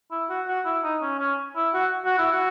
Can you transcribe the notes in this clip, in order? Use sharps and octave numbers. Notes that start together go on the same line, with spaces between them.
E4
F#4
F#4
E4
D#4
C#4
C#4
E4
F#4
F#4
E4
F#4